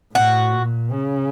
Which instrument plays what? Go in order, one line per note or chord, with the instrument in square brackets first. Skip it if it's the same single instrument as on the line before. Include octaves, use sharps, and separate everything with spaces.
[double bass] A2 [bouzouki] F#4
[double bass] A#2
C#3